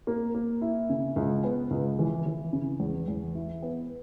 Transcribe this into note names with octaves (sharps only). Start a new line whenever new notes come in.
A#3
A#3
E4
C#3
C#2
B3
C#2
E3
E3
C#3
E2
E2
E4
B3